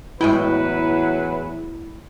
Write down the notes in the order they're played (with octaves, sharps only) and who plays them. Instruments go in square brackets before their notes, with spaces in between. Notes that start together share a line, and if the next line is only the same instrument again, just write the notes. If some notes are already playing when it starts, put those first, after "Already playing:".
[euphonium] E2 [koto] A2 G#3 G5 [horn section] F#3 B4 [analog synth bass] E4